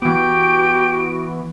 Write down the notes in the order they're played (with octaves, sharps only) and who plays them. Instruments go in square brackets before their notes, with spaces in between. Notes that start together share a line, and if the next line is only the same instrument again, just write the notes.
[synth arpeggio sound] E3 B3 [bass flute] F#4 [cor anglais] G4 [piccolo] D7